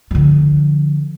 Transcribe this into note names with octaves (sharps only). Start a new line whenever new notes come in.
D3 F3